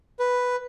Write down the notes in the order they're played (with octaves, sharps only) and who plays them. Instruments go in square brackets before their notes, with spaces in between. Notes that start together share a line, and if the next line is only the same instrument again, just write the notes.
[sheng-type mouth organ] B4